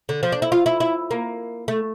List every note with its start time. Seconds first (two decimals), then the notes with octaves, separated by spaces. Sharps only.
0.09 D3
0.23 F3
0.32 D4
0.42 E4
0.52 F4
0.66 E4
0.80 E4
1.11 A#3
1.68 A3